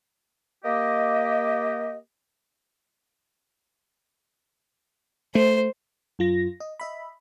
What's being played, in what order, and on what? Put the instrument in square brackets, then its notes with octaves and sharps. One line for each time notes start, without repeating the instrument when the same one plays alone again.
[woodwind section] A#3 G4 D#5
[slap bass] A3 [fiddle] C5
[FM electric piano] F#2 F4 A#6
D#5
D#5 E5 B5